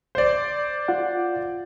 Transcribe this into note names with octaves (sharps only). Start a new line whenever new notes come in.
C5 D5
F4 F#5